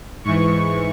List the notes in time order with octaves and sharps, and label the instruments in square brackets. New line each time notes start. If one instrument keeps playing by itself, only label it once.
[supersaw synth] G#2 E3 C#6